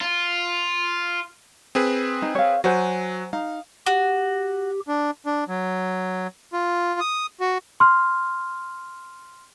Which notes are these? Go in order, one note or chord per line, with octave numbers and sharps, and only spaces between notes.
F4
C4 G#4 B4
D#4
C#5 F5
F#3 F#4 C5 G#5
D#4 F5
F#4 G4
D4
D4
F#3
F4
D#6
F#4
C6 F6